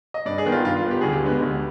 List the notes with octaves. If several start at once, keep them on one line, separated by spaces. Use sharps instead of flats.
D#5
G2 D5
G#4
D#3 B3
F4
G2 F4
F4
D#3 B3
G4
D2 G#4
G4
D3 G#3 B3
D2